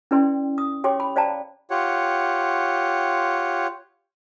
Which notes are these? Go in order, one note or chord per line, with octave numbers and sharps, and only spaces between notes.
C#4 E4 B4 D5 G5 C6
D#6
G4 C#5 G5 C6 D6
B5
C5 D5 F5 G5 A5 A#5
F4 G4 C#5 F#5